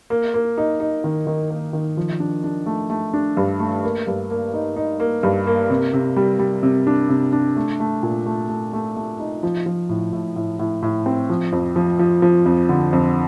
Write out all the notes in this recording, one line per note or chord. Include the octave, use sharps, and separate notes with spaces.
A#3
A#3
D#4
D#4
D#3
D#3
A#3
D#3
F3
D4
D4
A3
A3
D4
G2
A3
A#3
G2
A#3
D#4
D#4
A#3
G2
A#3
C3
C3
G3
G3
C3
D4
C3
D4
A3
A3
A#2
A3
A3
A3
A3
D#4
F3
F3
A2
A2
A2
A2
A2
C4
F3
F2
F3
F3
F3
F2
D3
F2